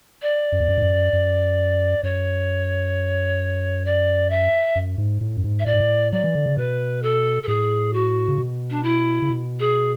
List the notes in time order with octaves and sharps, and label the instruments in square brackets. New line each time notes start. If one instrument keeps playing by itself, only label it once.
[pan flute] D5
[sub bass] F#2
E2
F#2
G#2
F#2
F#2
[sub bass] F#2 [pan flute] C#5
[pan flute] D5
E5
[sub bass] F#2
G#2
A2
F#2
G#2
[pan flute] E5
[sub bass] A2 [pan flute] D5
[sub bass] G#2
A2
[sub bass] F#3 [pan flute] D5
[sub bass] E3
D3
C#3
[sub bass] B2 [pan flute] B4
[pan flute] A4
A4
[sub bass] A2 [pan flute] G#4
[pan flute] F#4
[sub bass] C#3
B2
[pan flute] D4
E4
[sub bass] C#3
B2
[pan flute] G#4